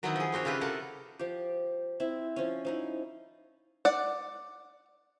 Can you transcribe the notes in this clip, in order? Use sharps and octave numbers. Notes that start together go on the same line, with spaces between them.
D#3 F#3 B3 C4 D#4 E4
F3 G#4
A#3 C4 F#4 C#5
C#3 E4 F4 G4 B4
C3 A4 A#4 F#5 A5
F3 G4
C4 E4 E5
F3 C#4
F3 D#4 E4
D5 F#5